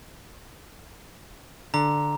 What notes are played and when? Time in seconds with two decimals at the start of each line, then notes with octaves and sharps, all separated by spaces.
1.74 D3 A#5